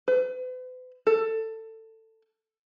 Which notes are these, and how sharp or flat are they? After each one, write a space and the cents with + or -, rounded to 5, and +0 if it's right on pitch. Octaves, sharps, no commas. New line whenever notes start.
B4 +45
A4 +15